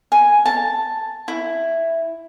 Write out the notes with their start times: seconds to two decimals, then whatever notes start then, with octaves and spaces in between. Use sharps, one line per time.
0.12 G#5
0.45 A5
1.28 E4